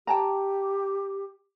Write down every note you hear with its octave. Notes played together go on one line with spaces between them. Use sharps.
G4 G5 A5 A#5